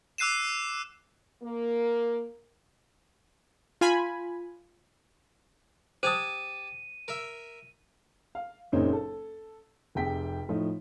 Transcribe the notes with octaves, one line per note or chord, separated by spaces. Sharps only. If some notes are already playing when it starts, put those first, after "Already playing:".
D6 E6 F#6 C7 D#7 E7
A#3
F4 G#5 B5
G4 C5 G#5 A5 D#6 D#7
A#4 E5
F5
F#1 A#2 C#3 C4 D#4 C#5
A4
F1 C3 G#4 G5 B6
A2 F3 A3 D#4